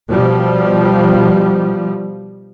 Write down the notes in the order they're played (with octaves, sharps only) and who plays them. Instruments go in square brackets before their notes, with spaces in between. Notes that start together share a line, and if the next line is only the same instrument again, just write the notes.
[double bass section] B2 F3 G3